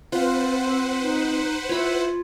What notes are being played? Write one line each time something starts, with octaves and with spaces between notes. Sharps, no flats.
C4 F4 B4 C5 F#5
D#4
E4 F4 C#5 B5